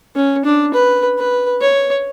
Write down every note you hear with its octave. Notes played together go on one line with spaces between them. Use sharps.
C#4
D4
B4
B4
C#5